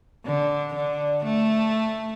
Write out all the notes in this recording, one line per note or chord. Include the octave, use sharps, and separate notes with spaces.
D3
D3
A3